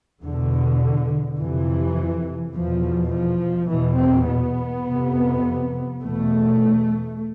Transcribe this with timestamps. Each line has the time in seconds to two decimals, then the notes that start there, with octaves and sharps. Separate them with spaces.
0.23 E2 B2 D3
1.39 F2 C3 E3
2.55 E2 B2 F3
3.13 F3
3.71 E2 B2 E3
3.99 C4
4.28 B3
4.86 F2 C3
6.02 E2 B2 A3